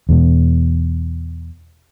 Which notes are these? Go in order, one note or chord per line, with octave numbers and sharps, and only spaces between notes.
E2 B2